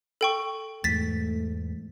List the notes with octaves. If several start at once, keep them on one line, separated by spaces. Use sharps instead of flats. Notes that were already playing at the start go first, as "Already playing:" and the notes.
A4 G5 C#6
E2 G#2 A3 A6 B6